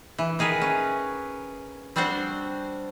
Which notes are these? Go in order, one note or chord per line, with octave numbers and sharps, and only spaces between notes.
E3
D#3 G#4 A#4 B4
C#4
G3 C4 D4 F#4 C5